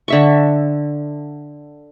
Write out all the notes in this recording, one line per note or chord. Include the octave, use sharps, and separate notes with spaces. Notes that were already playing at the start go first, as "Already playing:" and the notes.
D3 E5 C#6